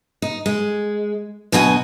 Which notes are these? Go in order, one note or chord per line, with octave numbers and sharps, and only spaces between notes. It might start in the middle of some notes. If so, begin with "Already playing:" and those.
D#4
G#3
D2 B2 F#3 F#4 D#5 G#5